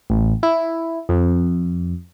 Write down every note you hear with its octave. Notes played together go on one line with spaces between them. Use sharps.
A1
E4
F2